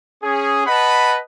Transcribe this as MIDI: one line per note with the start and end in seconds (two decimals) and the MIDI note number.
0.23 0.66 61
0.23 0.66 68
0.67 1.18 71
0.67 1.18 75
0.67 1.18 78
0.67 1.18 81
0.67 1.18 83